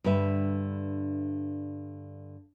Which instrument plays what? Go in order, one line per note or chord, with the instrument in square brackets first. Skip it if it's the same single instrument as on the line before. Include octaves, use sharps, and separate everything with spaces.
[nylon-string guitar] G2 D3 B4 E5